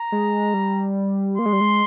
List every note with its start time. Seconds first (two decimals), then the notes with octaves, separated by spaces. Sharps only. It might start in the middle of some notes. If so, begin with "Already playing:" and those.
Already playing: A#5
0.12 G#3
0.54 G3
1.38 A#3 C6
1.46 G#3
1.53 G3
1.61 G#3